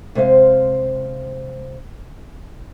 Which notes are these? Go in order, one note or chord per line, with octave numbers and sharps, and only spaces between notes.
C3 G#3 C4 C5 D#5 F5